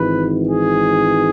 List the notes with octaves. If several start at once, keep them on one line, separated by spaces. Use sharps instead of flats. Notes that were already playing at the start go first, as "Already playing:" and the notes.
Already playing: G#1 G#2 E3 B4
G#4